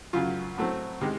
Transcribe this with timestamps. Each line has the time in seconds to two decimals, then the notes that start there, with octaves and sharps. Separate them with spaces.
0.13 F#2 C#3 F#3 F4
0.57 A2 F#3 A3 C4
1.01 C3 D#3 G#3